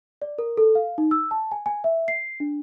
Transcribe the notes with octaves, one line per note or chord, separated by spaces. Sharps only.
D5
A#4
A4
F5
D#4
E6
A5
G#5
G#5
E5
C7
D4